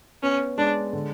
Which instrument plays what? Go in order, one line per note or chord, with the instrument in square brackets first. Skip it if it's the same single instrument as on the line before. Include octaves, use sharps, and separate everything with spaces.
[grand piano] B3 [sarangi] C#4
[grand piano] G#3 [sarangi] D4
[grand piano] D3